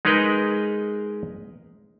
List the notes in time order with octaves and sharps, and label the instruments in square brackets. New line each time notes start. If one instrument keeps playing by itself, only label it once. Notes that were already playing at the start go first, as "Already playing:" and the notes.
[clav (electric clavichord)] G#3 D#4 G#4 A#4 B4 D#5